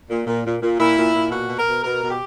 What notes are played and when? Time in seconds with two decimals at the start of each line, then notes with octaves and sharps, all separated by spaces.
0.10 A#2
0.27 A#2
0.44 A#2
0.62 A#2
0.79 A#2 E4
0.96 A#2
1.14 A#2
1.31 B2 F#4
1.50 B2
1.59 A#4
1.66 B2
1.84 B2 A#4
2.02 B2
2.10 G4